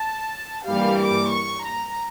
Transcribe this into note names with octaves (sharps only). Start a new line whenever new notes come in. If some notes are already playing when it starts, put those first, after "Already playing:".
Already playing: A5
G2 E3 G3 A#3 F5
D6
C#6
A#5